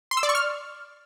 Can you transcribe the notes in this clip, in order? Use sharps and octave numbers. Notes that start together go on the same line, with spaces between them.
C6
E6
D5
C#6
F6